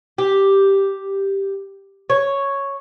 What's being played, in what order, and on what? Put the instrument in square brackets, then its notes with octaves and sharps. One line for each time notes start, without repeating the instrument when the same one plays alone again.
[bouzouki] G4
C#5